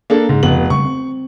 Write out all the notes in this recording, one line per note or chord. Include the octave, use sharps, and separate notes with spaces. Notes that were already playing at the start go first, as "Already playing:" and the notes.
A#3 D4 A4
G#2 C#3
F1 B3 F#7
C#3 G3 G#3 C#6
C4